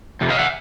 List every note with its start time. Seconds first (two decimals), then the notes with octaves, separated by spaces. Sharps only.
0.21 F2 C3
0.30 D#5 F5
0.39 E5 F#5